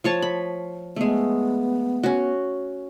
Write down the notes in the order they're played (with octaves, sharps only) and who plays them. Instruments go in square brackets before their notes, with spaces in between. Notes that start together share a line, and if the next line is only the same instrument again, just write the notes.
[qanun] F3 C#5 A5
B5
[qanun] G#3 A3 [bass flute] B3
[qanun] C#4 F#4